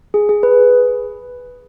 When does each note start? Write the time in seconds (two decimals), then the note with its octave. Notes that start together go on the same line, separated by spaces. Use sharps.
0.14 G#4
0.29 G#4
0.43 B4